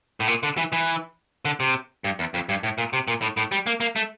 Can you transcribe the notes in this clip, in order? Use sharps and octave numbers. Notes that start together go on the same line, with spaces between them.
A2
A#2
D3
E3
E3
D3
C3
G2
E2
F2
G2
A2
A#2
C3
A#2
A2
A2
G3
A#3
A#3
A3